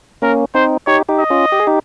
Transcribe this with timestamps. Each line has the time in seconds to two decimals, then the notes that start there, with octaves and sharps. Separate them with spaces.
0.22 A#3 C#4 A#4
0.55 C4 D#4 C5
0.87 D#4 G4 C#5
1.09 D#4 G4
1.19 D#5
1.30 C#4 F4
1.52 G4
1.60 G#4
1.67 D#4 G4